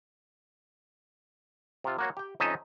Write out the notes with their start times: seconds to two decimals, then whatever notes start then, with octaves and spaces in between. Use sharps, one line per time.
1.84 C3 F4
1.99 A#3 F#4 C#5
2.17 G4 G5
2.40 F2 C#4 D#4 D#5 E5 A5